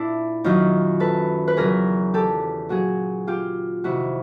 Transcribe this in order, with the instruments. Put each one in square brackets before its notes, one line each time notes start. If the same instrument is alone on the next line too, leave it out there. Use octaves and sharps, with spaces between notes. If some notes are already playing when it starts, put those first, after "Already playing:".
Already playing: [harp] A#2 D4 E4
F#2 D#3 F#3 D#4 F4
A4 B4
B4
E2 C#3 F#3 G#4 A#4
G4 A4
A#2 F#3 F#4 G#4
F4 G4
F2 C3 D#3 E4 F#4